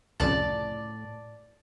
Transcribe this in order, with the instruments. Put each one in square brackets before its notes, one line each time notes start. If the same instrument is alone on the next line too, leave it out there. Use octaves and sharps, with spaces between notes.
[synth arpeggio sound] C2 F2 C#3 [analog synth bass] A2 [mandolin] D5 A5